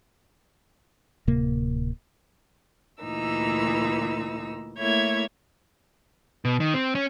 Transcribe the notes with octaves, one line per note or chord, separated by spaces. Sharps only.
D1 C3 A#3
D2 A#2 E3 D#4 E6
A3 A#3 E4 C#5 E5 G#6
B2
D#3
C4
C#4